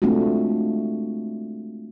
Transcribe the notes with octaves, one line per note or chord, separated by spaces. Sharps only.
G#3 A3 C4 D4 F4 F#4